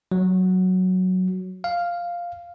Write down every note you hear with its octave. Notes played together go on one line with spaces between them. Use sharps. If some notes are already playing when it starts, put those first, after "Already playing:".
F#3
F5